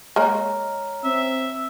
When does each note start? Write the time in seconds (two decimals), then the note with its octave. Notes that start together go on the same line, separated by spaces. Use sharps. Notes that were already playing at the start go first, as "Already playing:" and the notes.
0.16 G#3 A#3 C#5 A#5 F6
1.04 C4 E5